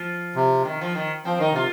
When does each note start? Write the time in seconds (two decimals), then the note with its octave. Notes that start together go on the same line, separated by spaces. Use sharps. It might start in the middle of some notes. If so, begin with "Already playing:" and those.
Already playing: F3
0.36 C3
0.65 D#3
0.81 F3
0.95 D#3
1.25 F3 C4
1.39 D#3 D#4
1.52 C3 F4